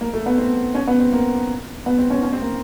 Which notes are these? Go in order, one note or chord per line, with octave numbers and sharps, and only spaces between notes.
A#3
A3
B3
C4
C#4
B3
C4
A#3
B3
C4
C#4
C#4
C4
A#3